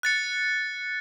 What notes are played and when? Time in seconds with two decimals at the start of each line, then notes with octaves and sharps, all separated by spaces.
0.03 F#6 A6 C#7